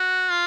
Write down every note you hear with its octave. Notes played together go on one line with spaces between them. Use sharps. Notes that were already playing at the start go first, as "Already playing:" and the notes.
Already playing: F#4
F4